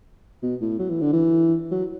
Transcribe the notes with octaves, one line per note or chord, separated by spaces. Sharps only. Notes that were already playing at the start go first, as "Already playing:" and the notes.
B2
A2
F#3
E3
D3
E3
F#3